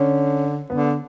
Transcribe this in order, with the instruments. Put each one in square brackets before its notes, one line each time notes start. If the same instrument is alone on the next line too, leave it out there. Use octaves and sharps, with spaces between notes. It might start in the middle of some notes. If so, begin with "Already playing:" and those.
Already playing: [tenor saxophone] D3 [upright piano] C#4
[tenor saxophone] D3 [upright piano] B3